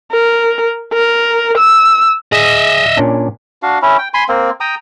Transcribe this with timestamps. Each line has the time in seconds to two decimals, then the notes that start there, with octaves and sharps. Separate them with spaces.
0.12 A#4
0.93 A#4
1.57 E6
2.32 G#4 D#5 E5
2.97 A#2 C#4 D4
3.62 D4 F#4 F5
3.82 C#4 E4
3.98 G5
4.14 G#5 B5 C6
4.28 A#3 C4
4.60 G5 A#5 D#6